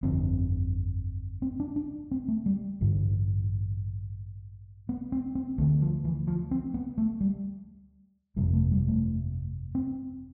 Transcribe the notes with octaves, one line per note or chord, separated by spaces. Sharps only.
G1 F2 D3 C4
C4
D4
D4
C4
A3
G3
A1 G2 D3
B3
C4
C4
D2 D3 A3
F3
E3
F3
C4
B3
A3
G3
G1 F2 C3 G3
A3
G3
A3
C4